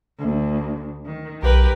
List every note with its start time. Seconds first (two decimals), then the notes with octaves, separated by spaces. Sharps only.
0.18 D2
1.05 D#3
1.43 B1 G4 A#4 B4